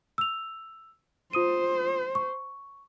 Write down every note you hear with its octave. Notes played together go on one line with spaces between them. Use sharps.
E6 F7
F4 C5 D#6 D#7
C#6